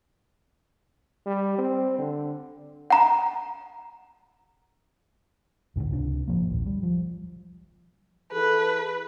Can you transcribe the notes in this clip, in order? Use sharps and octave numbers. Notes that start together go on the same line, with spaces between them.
G3
C4
D3
F#5 A#5
C#2 G#2 B2 D3
C#2 C3 E3 D4
G#1 D#2 F3 A#3
A#1 D#2
G3
F3
E3 G#4 A4 B4